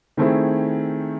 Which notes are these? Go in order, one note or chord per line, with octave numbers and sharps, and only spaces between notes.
D#3 A3 C4 E4 G#4